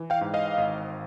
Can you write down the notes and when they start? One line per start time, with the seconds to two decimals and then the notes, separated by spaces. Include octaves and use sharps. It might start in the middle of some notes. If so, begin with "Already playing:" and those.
Already playing: E3
0.10 F5 G5
0.21 G#2
0.34 D#5 F5
0.58 G#1